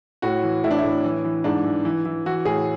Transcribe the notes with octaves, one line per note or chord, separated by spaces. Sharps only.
A2 F#4
E3
A2 E4
D4
A2 E4
E3
E3
G#2 D4
E3
E3
E3
E3 F#4
A2 G#4